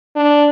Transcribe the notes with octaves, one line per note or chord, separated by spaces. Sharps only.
D4